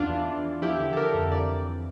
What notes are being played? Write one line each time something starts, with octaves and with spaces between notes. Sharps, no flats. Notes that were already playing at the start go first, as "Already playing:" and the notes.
Already playing: E2 D4 F4
E3
E3
E3
F3 E4 G4
D3
A4
D3 G4 A#4
F2
E3 D5